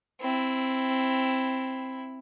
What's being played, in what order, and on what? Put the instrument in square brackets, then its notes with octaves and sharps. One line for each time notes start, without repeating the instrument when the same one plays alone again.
[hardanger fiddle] C4 E4